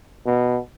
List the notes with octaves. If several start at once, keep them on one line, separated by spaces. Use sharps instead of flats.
B2